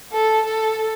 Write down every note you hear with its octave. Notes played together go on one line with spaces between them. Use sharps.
A4
A4